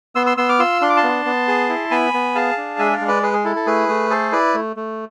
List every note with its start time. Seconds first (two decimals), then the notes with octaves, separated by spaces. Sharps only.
0.15 B3 C6 E6
0.26 C6 E6
0.37 B3 C6 E6
0.49 D6 F6
0.59 F4 C6 E6
0.82 D4 C6
0.90 D6
0.97 A5 C6
1.03 B3
1.25 B3
1.48 G#4
1.69 E4
1.91 B3 G#5 B5
2.14 B3
2.35 G#4 F5 A5
2.57 D4
2.79 G#3 E5 G#5
2.93 D5 F5
3.01 G#3
3.08 B4 D5
3.23 G#4 B4
3.33 G#4
3.44 E4 A4
3.56 A4
3.66 A3 G#4 B4
3.88 A3
4.10 G#4 A4 C5
4.32 E4 B4 D5
4.54 A3
4.76 A3